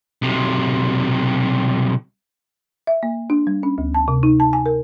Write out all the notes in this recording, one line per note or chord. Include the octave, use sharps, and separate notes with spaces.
B1 C3
E5
A#3
D4
G3
C#4
D2
A5
C3
D#4
A5
G#5
A#4